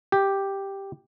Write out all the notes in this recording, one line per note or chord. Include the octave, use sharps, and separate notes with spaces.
G4